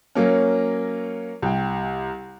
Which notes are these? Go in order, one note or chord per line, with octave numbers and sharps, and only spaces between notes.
F#3 A#3 C#4
C2 G5